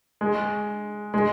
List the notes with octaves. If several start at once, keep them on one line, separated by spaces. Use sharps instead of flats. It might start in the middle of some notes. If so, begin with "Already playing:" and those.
G#3
G#3